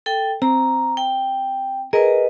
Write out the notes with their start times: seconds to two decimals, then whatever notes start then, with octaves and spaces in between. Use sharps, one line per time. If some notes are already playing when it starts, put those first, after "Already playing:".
0.06 A4 G5
0.42 C4 A#5
0.97 G5
1.93 G#4 A#4 B4 D#5